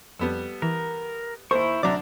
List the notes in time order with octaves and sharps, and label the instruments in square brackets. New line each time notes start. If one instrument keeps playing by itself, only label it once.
[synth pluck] F2 [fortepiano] G3 B3 A4
[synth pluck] E3 [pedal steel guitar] A#4
[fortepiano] D#2 [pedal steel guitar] E4 C#6 [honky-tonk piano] C5
[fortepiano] D2 D4 D6 [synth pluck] F#3 [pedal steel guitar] D5 E5 A#5